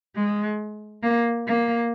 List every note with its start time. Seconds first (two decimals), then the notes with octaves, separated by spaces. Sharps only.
0.15 G#3
1.03 A#3
1.47 A#3